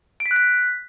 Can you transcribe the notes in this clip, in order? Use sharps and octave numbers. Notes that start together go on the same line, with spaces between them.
D7
B6
F#6
B6